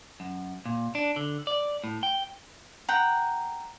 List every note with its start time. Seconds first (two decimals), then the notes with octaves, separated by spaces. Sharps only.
0.20 F#2
0.66 A#2
0.95 D4
1.16 D3
1.47 D5
1.84 A2
2.03 G5
2.88 F#5 G5 A#5